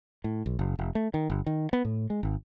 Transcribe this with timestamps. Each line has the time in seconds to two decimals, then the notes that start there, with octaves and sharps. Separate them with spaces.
0.24 A2
0.46 B1
0.59 F#1
0.79 F1
0.95 A3
1.14 D#3
1.30 G1
1.46 D#3
1.73 B3
1.85 A2
2.10 G#3
2.23 G#1